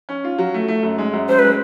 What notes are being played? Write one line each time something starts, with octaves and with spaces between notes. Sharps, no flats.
C#4
F4
F#3
A3
A3
F#2
G#3
F#2
F#2 C5
G#3 B4